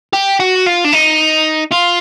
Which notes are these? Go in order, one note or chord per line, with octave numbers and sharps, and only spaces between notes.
G4
F#4
F4
D4
D#4
F4